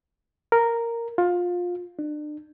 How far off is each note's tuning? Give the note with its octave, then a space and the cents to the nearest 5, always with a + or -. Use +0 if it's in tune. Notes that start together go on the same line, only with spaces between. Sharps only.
A#4 -5
F4 +20
D4 +35